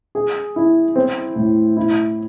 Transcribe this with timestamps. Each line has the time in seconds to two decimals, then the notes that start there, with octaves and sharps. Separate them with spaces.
0.15 G#4
0.56 E4
0.96 C4
1.36 A2
1.77 E4